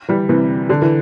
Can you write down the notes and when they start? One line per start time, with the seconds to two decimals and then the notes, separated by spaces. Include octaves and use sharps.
0.08 E3 G3
0.29 C3 E3
0.69 D3
0.82 E3